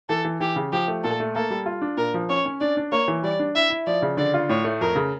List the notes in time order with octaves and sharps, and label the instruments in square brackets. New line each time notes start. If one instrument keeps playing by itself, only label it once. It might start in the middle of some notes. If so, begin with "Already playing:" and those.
[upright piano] E3 [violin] A4
[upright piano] E3
[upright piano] E3 [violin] G4
[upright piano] C#3
[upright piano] F3 [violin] G4
[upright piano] A3
[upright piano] A#2 [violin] A4
[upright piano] A3
[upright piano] A#3 [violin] A4
[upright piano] G3
F4
D4
[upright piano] A#2 [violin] A#4
[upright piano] F3
[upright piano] C#4 [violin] C#5
[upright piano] C#4
[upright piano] D4 [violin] D5
[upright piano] D4
[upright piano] A#3 [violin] C#5
[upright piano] E3
[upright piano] G3 [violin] D5
[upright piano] D4
[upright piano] E4 [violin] E5
[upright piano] E4
[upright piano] F3 [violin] D5
[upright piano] C#3
[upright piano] D3 [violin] D5
[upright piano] F4
[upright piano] A2 [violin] C#5
[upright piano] A3
[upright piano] F2 [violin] A#4
[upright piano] C#3